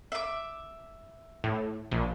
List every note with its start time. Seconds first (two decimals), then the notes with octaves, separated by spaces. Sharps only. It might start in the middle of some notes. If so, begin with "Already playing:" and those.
0.12 E5 D6
1.44 A2
1.91 A#1